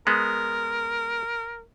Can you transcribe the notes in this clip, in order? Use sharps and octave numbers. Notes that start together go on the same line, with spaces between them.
G#3 B3 A#4